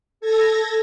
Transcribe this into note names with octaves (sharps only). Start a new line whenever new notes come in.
A4 G#6 A#6